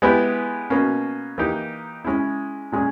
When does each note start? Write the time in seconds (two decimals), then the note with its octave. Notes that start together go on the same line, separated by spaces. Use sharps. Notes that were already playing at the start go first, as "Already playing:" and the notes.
0.02 G#3 B3 E4 G4
0.70 B2 A#3 C#4
1.38 E3 A#3 D#4 G4
2.04 G#3 C#4 E4
2.72 A#2 G#3 C#4 G#4